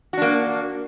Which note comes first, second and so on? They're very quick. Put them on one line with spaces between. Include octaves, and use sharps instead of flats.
F#4 D4 A#3